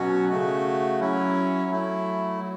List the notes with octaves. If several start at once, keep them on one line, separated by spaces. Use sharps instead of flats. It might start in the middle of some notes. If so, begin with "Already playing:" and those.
Already playing: B2 F#3 C#4 F#4
C#3 A3 F#4
F#3 C#4 E4
F#3 A3 E4
F#3